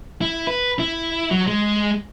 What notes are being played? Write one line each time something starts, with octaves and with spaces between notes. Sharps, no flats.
E4
B4
E4
F#3
G#3